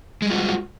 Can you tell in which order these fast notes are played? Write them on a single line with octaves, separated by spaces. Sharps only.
G#3 G3 F4 F#4